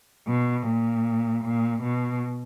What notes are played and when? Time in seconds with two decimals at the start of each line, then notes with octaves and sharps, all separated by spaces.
0.28 B2
0.67 A#2
1.44 A#2
1.82 B2